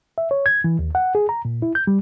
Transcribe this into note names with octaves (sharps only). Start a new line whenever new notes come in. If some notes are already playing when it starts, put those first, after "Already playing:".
E5
C#5
G#6
E3
D#2
F#5
G#4
A#5
A#2
E4
G6
G3